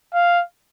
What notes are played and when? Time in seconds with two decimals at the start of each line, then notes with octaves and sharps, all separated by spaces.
0.13 F5